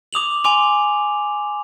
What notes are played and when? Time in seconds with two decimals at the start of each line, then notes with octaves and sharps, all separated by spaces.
0.13 D6 D#6 F7 F#7
0.44 G#5 C6 D6 F7